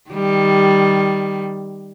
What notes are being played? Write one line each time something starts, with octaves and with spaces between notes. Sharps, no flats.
D#3 G3